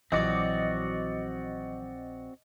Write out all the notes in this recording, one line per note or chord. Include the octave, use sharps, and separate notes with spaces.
A#1 E3 F#3 C4 F#4 D5 D#5 D6